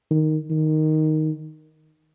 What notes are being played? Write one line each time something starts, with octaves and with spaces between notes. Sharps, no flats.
D#3
D#3